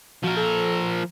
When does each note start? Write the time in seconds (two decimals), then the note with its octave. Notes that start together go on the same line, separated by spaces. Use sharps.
0.23 F3 F#4 A#4
0.37 A4